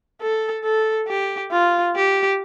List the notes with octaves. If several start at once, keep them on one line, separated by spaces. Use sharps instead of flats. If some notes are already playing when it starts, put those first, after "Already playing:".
A4
A4
G4
F4
G4